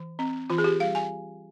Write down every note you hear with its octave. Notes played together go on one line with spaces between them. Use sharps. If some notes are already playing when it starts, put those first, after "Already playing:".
Already playing: E3
C4
E3 F4
G#4
G4
G3 F5
G#5